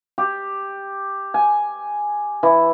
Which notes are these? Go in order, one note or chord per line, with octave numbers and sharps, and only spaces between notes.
G4
G#5
E3